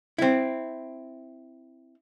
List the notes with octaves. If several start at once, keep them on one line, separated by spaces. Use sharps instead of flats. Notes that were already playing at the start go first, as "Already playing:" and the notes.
C4 E4